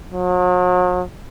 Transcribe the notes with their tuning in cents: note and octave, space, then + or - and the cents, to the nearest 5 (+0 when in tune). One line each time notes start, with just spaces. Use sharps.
F#3 -40